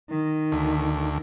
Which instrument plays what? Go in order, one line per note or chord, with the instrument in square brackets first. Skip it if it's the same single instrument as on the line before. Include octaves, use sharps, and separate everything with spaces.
[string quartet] D#3
[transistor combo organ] D2